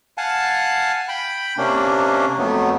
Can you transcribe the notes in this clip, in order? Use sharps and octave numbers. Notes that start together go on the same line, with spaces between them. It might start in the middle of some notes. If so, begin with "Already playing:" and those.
F5 F#5 G#5 A5
G5 B5
C3 A#3 C#4 D4
F2 F#3 A3 B3